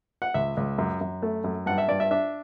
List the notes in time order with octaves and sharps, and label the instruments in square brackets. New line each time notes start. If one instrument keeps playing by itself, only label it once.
[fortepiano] F#5
C#2 E5
C#2
F#2
F#2
A3
F#2
G2 F#5
E5
G2 D5
E5
D4 E5